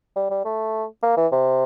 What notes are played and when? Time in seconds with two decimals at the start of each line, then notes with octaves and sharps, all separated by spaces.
0.16 G3
0.31 G3
0.45 A3
1.03 A#3
1.17 E3
1.32 C3